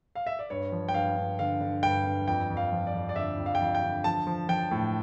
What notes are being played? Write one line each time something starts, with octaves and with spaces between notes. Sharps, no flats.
F5
E5
D5
G2 C#5
F3
G5
G2 F5
G2
D3 F5
D3
G2 G5
G2
F2 G5
F2
F5
F3
D5
F2
D5
D3 E5
F2
F5
G5
F2 F5
G5
D3
F3 A5
F3
F3 G5
A2